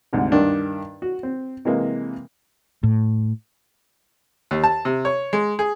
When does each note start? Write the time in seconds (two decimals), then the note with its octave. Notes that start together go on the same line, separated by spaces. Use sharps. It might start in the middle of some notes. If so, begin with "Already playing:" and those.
0.13 D2 G#2 C3
0.32 G2 D#3 D4
1.02 F#4
1.23 C4
1.65 C3 E3 G#3 A#3
2.83 A2
4.51 D#2
4.64 A5
4.85 C3
5.05 C#5
5.33 G#3
5.59 G#4